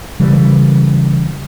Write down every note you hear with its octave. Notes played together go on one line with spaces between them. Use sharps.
C#3 E3 G3